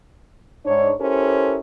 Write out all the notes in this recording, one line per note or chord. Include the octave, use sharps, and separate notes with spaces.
G#2 D4 C#5
C#4 E4 G4 A4 A#4 C5